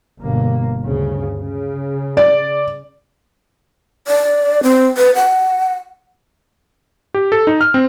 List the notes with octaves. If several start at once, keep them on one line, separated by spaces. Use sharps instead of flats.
G1 B2 A#3
D2 G2 C#3
C#3
D5
D5
C4
B4
F#5
G4
A4
D#4
F6
C4